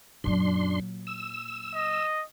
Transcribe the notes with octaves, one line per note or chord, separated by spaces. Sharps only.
F#2 A#2 F#3 D4 C6
E6
D#5